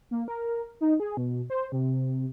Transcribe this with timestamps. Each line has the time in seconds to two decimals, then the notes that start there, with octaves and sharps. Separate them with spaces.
0.11 A#3
0.28 A#4
0.81 D#4
1.00 G#4
1.17 B2
1.50 C5
1.72 C3